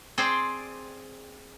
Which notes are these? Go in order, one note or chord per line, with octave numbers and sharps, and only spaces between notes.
C4 G#4 C5 D5 G5